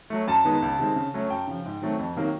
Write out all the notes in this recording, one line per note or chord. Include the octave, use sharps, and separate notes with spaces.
F#3 A3
F#2 A5
D#3 G#3 B3 D#4
C#2
C3 D#3 G#3 C4
C#3
F#3 A3 C#4
F#2 G5
C#3 F3
G#2
D#3 F#3 A3 C4
F2
C3 D#3 F#3 A#3